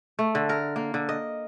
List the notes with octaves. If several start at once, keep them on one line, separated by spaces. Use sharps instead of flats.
A3
D3
A#4
A#3
D3
D#5